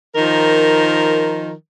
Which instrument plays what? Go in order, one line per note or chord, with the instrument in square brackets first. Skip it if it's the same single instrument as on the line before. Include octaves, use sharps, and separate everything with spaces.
[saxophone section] D#3 F3 A#4